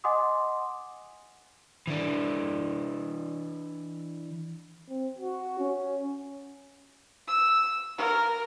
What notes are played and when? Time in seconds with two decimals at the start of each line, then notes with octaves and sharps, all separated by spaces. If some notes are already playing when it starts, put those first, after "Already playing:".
0.04 D#5 F#5 G#5 C6 D6 D#6
1.87 E3 D4
4.89 C4
5.18 F#4
5.59 C#4
7.28 E6
7.98 A#4